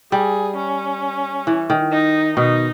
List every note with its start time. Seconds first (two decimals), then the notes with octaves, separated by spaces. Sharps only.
0.12 G3 G#4
0.56 C#4
1.47 E3
1.70 D#3
1.91 D#4
2.37 B2 D#4